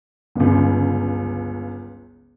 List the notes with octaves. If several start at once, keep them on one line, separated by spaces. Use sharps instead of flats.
G1 C#2